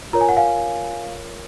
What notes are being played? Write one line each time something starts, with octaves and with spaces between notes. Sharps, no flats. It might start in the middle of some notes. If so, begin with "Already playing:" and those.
F4 A#4 C#5 A#5
G#5
F#5
F5 G#5